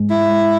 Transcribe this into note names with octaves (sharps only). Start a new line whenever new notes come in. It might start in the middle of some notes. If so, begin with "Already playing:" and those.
Already playing: G#2 G#3
E4